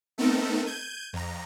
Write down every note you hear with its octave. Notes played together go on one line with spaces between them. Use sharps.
A3 B3 C4 D#4 A4 A#4
G6 G#6 D#7
F2 A#5